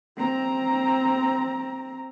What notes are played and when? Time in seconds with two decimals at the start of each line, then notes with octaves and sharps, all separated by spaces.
0.17 C4 A#5